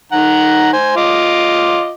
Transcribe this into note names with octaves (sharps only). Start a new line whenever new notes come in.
D#3 F#5 A#5
C5 G#5
F4 D#5 D6